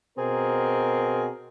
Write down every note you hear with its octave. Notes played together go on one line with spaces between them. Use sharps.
B2 C4 G#4 A#4